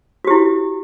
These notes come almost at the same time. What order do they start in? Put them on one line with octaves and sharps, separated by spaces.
F#4 G4 E4